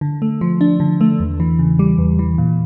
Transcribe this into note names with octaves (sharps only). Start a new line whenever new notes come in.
D3
A3
F3
D4
D3
A3
E2
E3
C#3
G3
E2
E3
A#2